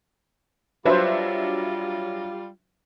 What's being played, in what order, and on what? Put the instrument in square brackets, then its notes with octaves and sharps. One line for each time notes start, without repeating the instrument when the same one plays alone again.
[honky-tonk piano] F#3 D4 E5 [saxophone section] G3 F4 [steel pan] B4 C5